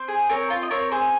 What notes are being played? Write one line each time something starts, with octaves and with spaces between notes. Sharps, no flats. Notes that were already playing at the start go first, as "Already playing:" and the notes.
Already playing: C4 C5
G#4
C4 A#4 C#5
F4
D#5
C4 A#4 C#5
G#4 C5